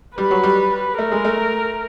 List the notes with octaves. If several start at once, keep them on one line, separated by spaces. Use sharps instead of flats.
G3 B4
F#3
G3
A3 A#4
G#3
A3